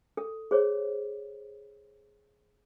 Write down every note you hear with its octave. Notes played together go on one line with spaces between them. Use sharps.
A4
G#4 C5 C#5